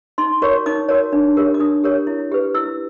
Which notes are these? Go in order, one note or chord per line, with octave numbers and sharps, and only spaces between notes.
D#4 C6
F#4 A#4 C#5 C#6
D#4 D6
F#4 A#4 C#5
D4
G4 A#4 C#5
D6
D4 D#6
G4 A#4 C#5
E4
G4 B4
E4 E6